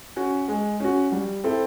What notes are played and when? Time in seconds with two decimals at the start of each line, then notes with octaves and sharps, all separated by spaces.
0.16 C#4 F#4
0.48 G#3
0.80 C#4 F#4
1.12 G3
1.44 C4 E4 A4